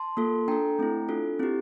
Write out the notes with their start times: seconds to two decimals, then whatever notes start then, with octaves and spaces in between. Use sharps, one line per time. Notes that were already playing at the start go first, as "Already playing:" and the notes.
Already playing: A5 C6
0.17 A#3 F4 A4
0.48 D4 A4 G5 A#5
0.79 A3 C4 E4
1.09 D4 F4 A4
1.39 C4 E4 G4